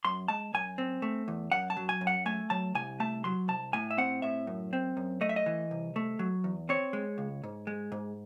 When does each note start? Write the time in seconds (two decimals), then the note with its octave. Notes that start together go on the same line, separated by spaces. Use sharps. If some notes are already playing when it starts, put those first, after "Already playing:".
0.05 F#2 C6
0.28 G#3 A5
0.54 F#2 G#5
0.78 C4
1.02 A3
1.28 E2
1.52 F#2 F#5
1.70 A5
1.77 F#3
1.89 G#5
2.01 F#2
2.07 F#5
2.26 A3 G#5
2.50 F#3 A5
2.75 C2 G#5
3.00 A3 A5
3.24 F#3 C6
3.48 C2 A5
3.73 A2 G#5
3.91 E5
3.98 C4 F#5
4.22 A2 E5
4.47 F#2
4.73 C4
4.97 F#2
5.21 A3 D#5
5.29 E5
5.36 D#5
5.46 E3
5.71 C2
5.96 A3
6.19 F#3
6.44 E2
6.69 C4 C#5
6.93 G#3
7.18 C#2
7.44 G#2
7.67 G#3
7.92 G#2